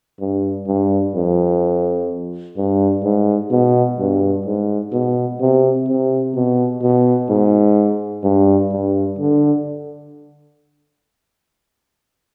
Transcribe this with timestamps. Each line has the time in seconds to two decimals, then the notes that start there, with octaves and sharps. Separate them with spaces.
0.20 G2
0.68 G2
1.15 F2
2.57 G2
3.03 G#2
3.51 B2
3.99 G2
4.46 G#2
4.93 B2
5.41 C3
5.88 C3
6.35 B2
6.83 B2
7.29 G#2
8.24 G2
8.72 G2
9.19 D3